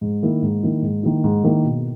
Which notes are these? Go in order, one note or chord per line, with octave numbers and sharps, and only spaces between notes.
G#2
D#3 A#3 E4
G#2
D#3 A#3 E4
G#2
D#3 A#3 E4
G#2
D#3 A#3 E4
B2